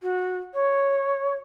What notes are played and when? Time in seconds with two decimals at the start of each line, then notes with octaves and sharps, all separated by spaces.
0.02 F#4
0.53 C#5